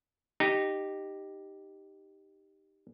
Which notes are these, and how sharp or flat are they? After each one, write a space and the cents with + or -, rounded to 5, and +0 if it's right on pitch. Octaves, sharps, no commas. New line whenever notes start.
D#4 -15 G4 +0